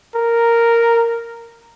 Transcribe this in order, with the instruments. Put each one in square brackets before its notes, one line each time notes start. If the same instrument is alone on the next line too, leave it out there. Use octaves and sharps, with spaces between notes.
[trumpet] A#4